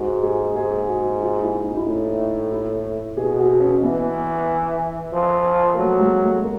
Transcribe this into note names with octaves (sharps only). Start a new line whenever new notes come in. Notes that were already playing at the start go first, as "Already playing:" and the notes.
Already playing: G#2 F#4
G#4
G#2 G#4
F#4
F4
E4
D#4
E4
A2 D#4
E4
B2 G#4
F#4
C#4
E3 B3
F3
A#3
F#3 A3
G#3
A3
A#3